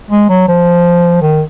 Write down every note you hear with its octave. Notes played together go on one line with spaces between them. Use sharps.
G#3
F#3
F3
D#3